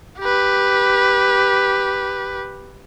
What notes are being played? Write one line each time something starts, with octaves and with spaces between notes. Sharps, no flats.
G4 B4